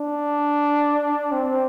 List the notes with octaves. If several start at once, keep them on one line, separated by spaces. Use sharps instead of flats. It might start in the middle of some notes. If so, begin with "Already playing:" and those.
Already playing: D4
C4